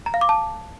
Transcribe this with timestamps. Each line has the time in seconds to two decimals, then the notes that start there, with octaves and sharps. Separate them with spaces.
0.06 A#5
0.14 F5
0.21 D6
0.29 A5